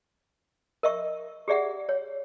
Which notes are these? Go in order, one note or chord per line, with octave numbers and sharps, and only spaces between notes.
A#4 D#5 E5 C#6
G4 G#4 D5 E5 F#5
C#5